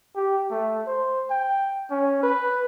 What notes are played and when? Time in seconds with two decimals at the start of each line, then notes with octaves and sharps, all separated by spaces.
0.16 G4
0.50 A3
0.87 C5
1.30 G5
1.91 C#4
2.23 B4